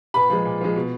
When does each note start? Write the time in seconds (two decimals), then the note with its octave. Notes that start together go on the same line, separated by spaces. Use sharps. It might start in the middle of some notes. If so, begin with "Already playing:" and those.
0.14 A#2 B4 B5
0.30 F3 G#3
0.45 A#2
0.61 F3 G#3
0.76 B2